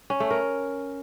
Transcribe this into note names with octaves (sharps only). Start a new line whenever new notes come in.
C#4
A3
A#4